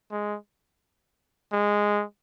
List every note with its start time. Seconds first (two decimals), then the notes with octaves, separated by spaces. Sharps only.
0.11 G#3
1.52 G#3